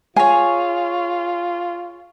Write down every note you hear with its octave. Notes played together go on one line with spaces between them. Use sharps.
F4 G#4 C#5 G#5